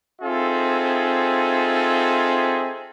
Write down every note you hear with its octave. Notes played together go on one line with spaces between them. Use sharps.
C4 D#4 F4 G#4 A4 E5